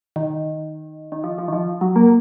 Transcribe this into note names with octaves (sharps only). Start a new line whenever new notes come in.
D#3
D#3
F3
F3
D#3
F3
F#3
A#3